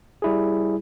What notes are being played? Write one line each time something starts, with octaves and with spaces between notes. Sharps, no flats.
G3 E4 G#4